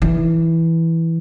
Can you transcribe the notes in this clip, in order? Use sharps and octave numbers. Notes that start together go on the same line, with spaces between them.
E3